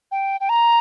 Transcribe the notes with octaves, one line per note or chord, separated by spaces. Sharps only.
G5
G5
A#5